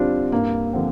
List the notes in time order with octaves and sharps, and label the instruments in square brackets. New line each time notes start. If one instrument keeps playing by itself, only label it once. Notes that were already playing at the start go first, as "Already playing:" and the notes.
Already playing: [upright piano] D3 G3 D4 F4 [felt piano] C4
[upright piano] G2 [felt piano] A#3
[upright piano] D3 F3 C4